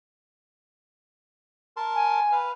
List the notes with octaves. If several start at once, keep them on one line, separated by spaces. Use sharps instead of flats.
A#4 A5 C6
G#5
B4 F5